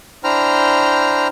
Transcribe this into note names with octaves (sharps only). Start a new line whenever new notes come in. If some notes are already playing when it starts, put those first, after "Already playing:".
D4 E4 C5 G5 A#5 F6